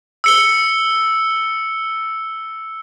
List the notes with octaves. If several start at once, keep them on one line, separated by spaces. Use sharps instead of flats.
E6 C#7 G7